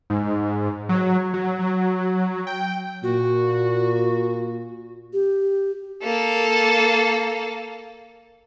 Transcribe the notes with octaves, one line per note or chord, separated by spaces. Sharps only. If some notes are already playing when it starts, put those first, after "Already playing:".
G#2
F#3
F#3
F#3
G5
A#2 F#4
G4
A#3 A4